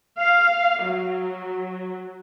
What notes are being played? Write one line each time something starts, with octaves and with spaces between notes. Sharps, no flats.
F5
F#3